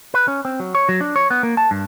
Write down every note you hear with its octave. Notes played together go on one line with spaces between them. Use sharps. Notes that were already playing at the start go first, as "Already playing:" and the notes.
B4
C#4
C4
F#3
C#5
F#3
D4
C#5
B3
A#3
A5
G2